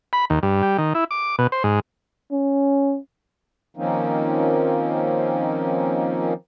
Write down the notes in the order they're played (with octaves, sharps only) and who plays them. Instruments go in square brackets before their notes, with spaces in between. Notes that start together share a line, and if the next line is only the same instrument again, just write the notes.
[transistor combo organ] B5
D#2
G2
G3
D#3
E4
D6
B2
C5
G#2
[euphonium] C#4
[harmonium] D#3 F3 A#3 C4 C#4 D#4